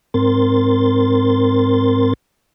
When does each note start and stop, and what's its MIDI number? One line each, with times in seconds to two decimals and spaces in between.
0.14 2.13 44
0.14 2.13 60
0.14 2.13 70
0.14 2.13 84
0.14 2.13 93